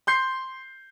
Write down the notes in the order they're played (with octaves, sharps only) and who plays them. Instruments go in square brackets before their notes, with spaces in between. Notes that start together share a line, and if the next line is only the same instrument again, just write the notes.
[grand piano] C6 G6 C7